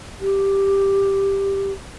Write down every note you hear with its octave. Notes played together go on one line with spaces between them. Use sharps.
G4